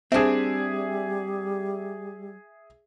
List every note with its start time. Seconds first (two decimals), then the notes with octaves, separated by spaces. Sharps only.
0.12 G3 C4 D4 G#4 E5